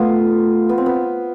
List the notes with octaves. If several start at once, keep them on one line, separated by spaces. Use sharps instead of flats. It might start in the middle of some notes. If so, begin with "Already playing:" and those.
Already playing: A3 B3 F4
B3
C4
B3